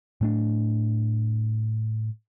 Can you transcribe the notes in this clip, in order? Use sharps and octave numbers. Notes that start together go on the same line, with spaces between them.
A2 A3 D4